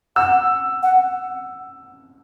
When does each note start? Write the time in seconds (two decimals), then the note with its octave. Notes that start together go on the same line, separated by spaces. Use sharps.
0.16 F#5 E6
0.83 F#5